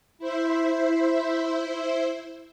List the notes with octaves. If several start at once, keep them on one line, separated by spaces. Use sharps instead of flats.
E4 C5 E5